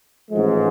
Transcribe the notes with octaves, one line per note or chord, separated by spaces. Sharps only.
A1 G#2 F3 G#3